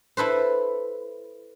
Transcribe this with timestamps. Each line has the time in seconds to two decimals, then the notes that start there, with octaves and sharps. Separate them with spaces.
0.17 E4 A4 B4 C5